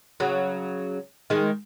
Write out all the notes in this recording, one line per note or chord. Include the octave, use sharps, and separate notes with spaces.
C#3 F#3
D#3 G#3